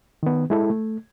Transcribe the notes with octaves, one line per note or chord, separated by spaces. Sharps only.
D#3 B3
G#3 E4 A4
A3